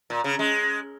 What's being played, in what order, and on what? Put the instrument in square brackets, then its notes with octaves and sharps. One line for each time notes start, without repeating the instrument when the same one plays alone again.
[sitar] A#2
C#3
G#3